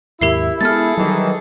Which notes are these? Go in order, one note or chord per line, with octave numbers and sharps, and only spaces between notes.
D#2 G#2 E4 G4 A#4 E5 C7
G#3 B3 G#4 A4 F6 A6
D#3 E3 F#3 G3